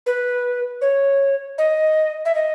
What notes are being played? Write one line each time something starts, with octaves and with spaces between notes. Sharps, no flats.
B4
C#5
D#5
E5
D#5